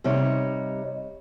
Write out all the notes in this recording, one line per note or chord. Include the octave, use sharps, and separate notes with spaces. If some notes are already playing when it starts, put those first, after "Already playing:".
C3 G3 D#4 C#5